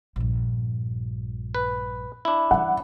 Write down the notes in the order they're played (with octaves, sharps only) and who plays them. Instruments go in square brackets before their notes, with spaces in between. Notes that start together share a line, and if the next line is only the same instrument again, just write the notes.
[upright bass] A#1 G2
[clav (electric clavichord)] B4
D4 E4
[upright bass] E3 G3 [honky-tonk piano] F#5